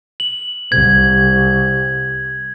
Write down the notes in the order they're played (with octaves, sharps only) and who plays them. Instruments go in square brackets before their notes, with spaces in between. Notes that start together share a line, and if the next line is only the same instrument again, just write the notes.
[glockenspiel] F#7
[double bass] C2 [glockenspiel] G#6